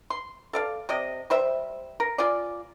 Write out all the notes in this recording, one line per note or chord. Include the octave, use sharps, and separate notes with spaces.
C6
A4 D5 F5
C3 D5 D#5
G3 C5 E5
A#4
F4 G#4 D5